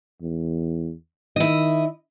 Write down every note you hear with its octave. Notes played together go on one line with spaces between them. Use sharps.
E2
D#3 E4 D#5